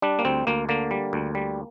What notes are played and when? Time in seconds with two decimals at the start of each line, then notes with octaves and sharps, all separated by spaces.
0.02 G3 D4
0.19 A#3
0.25 D2 C4
0.47 D2 A#3
0.69 D3 A#3
0.91 G3
1.13 D2
1.35 G3